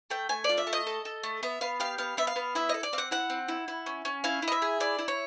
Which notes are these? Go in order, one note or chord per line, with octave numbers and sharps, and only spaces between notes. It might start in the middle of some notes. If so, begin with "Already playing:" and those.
A3 G5
A3 G#5
F4 D5
E5
A3
D#5
A4
A4
A3
B3 E5
B3 F5
G4 F5
B3 F5
B3 E5
F5
B3
E4 E5
D#5
A4
D5
C4 F5
F#5
E4 F#5
C4
E4
E4
C#4
C#4
E4 F5
E4
D#5
E5
G#4
E4 D5
E4
C#5